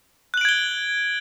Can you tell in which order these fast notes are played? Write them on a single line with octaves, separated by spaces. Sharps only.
F#6 F#7 D7 G#6 G7